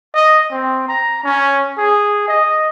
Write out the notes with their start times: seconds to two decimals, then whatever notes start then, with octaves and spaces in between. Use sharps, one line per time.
0.14 D#5
0.51 C4
0.88 A#5
1.24 C#4
1.78 G#4
2.28 D#5